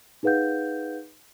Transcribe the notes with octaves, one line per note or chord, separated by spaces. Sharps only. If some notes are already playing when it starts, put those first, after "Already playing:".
D#4 G#4 B4 F5 F#5 G6